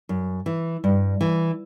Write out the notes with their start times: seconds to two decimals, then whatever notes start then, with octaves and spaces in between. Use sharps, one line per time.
0.09 F#2
0.46 E3
0.84 G2
1.21 E3